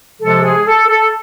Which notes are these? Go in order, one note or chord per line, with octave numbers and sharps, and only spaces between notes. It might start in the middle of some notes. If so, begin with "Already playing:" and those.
C3 F3 G#3 A4
G#4
A4
A4